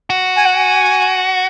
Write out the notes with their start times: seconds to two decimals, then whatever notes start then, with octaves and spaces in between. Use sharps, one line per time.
0.10 F#4
0.36 G#5
0.45 F#5
0.55 G#5